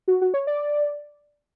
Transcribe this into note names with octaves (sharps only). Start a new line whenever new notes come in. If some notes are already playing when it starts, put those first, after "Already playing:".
F#4
F#4
C#5
D5